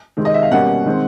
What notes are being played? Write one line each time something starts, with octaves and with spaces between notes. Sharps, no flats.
C3 D#3 G#3 C4
D#5
E5
F5
B2 G3 A#3 C#4 F#5
D#3 G#3 C4